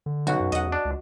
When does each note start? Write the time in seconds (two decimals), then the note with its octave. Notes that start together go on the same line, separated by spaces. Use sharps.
0.06 D3
0.27 B1 F#4
0.40 F#2
0.52 E2 D#5 F#5
0.72 D4
0.85 C#2